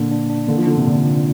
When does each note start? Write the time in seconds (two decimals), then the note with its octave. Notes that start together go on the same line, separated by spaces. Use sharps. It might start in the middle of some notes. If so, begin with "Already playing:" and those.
Already playing: A#2 D3 A#3 D4
0.11 D4
0.30 D4
0.48 D3 A#3
0.58 F3
0.67 D3 F4
0.77 C3
0.86 A#2 D3
1.05 A#3